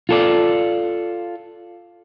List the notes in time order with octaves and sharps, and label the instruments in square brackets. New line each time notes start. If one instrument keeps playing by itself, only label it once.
[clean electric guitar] F4 A4 D5